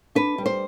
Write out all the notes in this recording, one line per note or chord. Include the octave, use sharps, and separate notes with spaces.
D4 B4
G3
C5